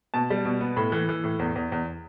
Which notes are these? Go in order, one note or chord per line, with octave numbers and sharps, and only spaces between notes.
B2 A5
G3
B2
B3
A2 B5
E3
E3
A2
E2
E2
E2